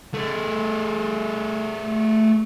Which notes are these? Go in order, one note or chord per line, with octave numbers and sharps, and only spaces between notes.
A3 G#4